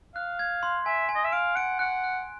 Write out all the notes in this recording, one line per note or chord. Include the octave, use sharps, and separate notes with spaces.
F5 F#6
G#6
C6
E5 G#5
G#5
D#5
E5
F5 D7
F#5 D7
F#5 F#6
F#6